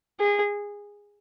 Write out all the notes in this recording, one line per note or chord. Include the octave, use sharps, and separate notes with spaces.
G#4